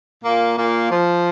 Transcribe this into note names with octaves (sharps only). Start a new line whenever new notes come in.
A#2 A#3
A#2 A#3
F3